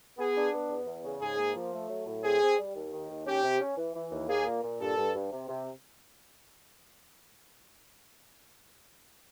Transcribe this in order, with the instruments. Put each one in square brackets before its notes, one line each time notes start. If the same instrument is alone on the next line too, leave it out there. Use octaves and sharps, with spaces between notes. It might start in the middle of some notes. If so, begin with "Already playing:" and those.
[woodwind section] B3 [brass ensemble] G#4
[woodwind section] D4
B3
E2
E2
C#3
[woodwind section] G#2 [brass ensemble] G#4
[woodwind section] A#3
F3
A3
F#3
A2
[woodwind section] C4 [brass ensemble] G#4
[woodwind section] C4
G3
D#2
D#3
D#2
[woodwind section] C#4 [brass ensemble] G4
[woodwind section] C3
C#4
E3
E3
D#2
[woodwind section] A#3 [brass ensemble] G#4
[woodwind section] A#2
A#2
[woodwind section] G2 [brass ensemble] A4
[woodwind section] G2
G2
C3
C3